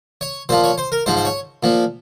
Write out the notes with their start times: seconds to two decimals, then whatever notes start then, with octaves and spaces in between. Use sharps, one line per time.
0.21 C#5
0.49 A#2 F3 C5
0.64 C#5
0.78 C5
0.92 A#4
1.06 G#2 F3 C5
1.17 C5
1.25 C#5
1.63 A#2 F3